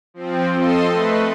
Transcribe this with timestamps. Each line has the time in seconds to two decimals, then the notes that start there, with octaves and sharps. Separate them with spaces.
0.14 F3 C4
0.54 A4 D#5 C6
0.91 A3 B4